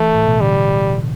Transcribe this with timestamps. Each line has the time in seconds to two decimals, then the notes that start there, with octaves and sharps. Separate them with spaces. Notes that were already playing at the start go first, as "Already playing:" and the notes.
Already playing: E3 A3
0.15 A2
0.27 B2
0.41 D3 G3